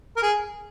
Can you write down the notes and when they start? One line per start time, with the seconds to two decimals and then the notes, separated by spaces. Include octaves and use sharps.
0.17 A#4
0.22 G#4